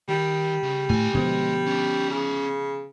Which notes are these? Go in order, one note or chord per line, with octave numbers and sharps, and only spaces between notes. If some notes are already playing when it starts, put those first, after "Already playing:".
D#3 G3
C#3
D2 A2 G#5
B2 D3 F3 G#3
C#4 D5
C#3